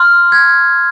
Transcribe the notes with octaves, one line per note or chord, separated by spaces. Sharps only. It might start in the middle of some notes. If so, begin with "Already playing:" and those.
Already playing: C6 F6
G#6